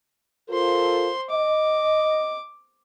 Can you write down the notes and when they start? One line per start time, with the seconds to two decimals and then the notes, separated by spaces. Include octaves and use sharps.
0.49 F4 A4 A#4 C5 C6
1.30 D#5 D6